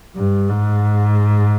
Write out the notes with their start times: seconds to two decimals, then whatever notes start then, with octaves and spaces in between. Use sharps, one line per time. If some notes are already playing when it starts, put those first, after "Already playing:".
0.16 G2
0.49 G#2